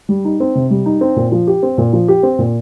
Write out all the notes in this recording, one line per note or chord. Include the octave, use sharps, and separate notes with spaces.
G3
D#4
C4
C3
G3
D#4
C4
A#2
F3
G4
C4
A#2
F3
G4
C4
A#2